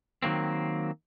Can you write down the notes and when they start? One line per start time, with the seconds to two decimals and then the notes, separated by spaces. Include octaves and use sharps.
0.23 D#3 F#3 A#3 C4